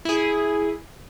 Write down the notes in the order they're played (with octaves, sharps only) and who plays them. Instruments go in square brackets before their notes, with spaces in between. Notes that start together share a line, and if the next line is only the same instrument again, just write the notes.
[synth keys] E4 G#4